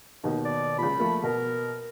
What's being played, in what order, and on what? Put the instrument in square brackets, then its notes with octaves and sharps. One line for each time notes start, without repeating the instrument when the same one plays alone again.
[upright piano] D#2 B2 D#3
[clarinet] D5
[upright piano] C#2 A#2 [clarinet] B5
[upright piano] F2 A3 A#3
[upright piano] B2 [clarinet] A#4